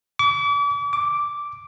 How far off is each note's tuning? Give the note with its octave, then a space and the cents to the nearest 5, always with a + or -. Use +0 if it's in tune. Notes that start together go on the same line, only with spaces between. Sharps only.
D6 -40
D6 -5